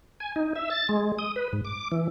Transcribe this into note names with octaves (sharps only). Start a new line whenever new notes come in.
G#5
D#4
E5
A6
G#3
D#6
B4
G#2
D6
E3